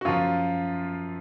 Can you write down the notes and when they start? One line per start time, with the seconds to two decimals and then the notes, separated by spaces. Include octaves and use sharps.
0.01 F#4
0.05 F#2 F3 F4